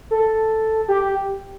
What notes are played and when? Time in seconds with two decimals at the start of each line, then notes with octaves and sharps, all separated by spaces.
0.11 A4
0.88 G4